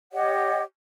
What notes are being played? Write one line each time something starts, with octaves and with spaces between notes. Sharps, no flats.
G4 C#5 D#5 F#5